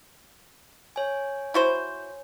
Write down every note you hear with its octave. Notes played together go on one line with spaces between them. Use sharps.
C#5 G#5
E4 F#4 C5